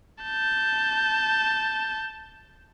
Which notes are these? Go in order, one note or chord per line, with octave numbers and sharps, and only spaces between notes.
A5 G6